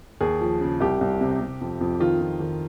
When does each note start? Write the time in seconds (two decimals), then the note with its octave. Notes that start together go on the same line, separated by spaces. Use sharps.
0.21 D#2 G#4
0.41 F3
0.61 C#3
0.80 C2 G4
1.01 C2
1.21 C3
1.41 C3
1.61 F2
1.81 F2
2.00 D#3 F4
2.20 F2
2.40 D#3